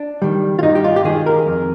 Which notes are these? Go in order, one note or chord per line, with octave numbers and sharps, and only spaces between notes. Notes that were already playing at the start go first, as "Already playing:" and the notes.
Already playing: D4
D#3 G3
F4
G2 D#4
G4
F4
G4
D#3 G#3 G#4
A#4
F2